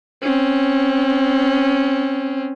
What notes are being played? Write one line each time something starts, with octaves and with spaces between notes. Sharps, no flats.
C4 C#4